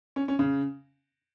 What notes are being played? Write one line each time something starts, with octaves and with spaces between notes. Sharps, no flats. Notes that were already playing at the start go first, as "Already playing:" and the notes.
C#4
C#4
C#3